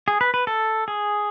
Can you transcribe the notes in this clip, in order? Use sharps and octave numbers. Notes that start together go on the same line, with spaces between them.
G#4
B4
B4
A4
G#4